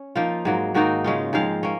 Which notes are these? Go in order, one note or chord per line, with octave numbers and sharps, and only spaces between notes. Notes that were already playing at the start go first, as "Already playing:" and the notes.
Already playing: C#4
F3 A#3 D#4 F4
G#2 F#3 A#3
G#2 D#3 A#3 D#4 F#4
C#3 G#3 C#4 F4
G#2 F3 G#3 C4 F5
A#3 C#4